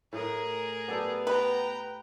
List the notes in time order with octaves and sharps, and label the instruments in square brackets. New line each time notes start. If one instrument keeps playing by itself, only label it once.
[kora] A2 [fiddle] G#4 A#4
[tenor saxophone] B3 [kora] G4 A4 D5
[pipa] B4 [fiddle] G5 A#5